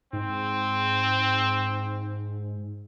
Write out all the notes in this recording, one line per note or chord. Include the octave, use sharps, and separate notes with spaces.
G#2 C4